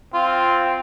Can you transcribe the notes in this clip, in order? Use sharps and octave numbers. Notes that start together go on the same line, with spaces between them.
C4 F4